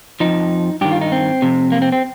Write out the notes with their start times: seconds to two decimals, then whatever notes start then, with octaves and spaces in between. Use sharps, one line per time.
0.20 F2 F3 D#4
0.81 G2 D#3 G4
0.91 F4
1.02 D#4
1.12 C4
1.42 F2 C3
1.72 A#3
1.82 C4
1.92 C4